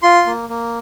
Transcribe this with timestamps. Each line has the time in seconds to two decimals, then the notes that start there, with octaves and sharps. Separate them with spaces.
0.03 F4 C6
0.26 A#3
0.49 A#3